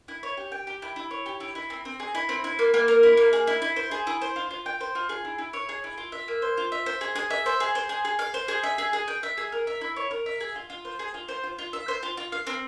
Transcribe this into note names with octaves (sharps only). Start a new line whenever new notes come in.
E4
C#5
G4
G5
G4
E4
E4
C#5
G4
E4
E4
C4
C4
G#4
E4
C4
E4
A#3
A#3
A#4
E4
A#3
G#4
E4
E4
C5
G#4
E4
C5
F4
F4
G5
C5
F4
G#4
E4
E4
C#5
G#4
E4
F4
E5
A#3
C5
F4
E5
C5
G#4
G#4
E5
C5
G#4
C5
G#4
G#4
F5
C5
G#4
E5
G#4
G#4
G5
E5
G#4
A#4
E5
E4
C#5
A#4
E5
G#4
F4
F4
C5
G#4
F4
C5
F4
F4
E5
C5
F4
F4
F5
C4